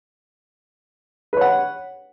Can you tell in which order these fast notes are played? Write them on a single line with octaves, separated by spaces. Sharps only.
B4 C#5 F#5